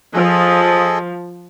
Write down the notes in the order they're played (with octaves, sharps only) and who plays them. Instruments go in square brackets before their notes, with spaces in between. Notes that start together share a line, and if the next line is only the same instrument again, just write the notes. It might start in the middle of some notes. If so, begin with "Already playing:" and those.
[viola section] F3 [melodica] G#4 A4 D#5